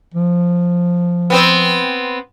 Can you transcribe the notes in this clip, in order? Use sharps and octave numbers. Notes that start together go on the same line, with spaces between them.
F3
B3 C4 C5